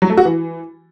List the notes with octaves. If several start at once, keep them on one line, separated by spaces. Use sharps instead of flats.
F#3
A3
F#4
E3